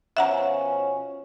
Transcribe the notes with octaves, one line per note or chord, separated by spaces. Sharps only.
B2 F3 C#4 E5 F#5 A#5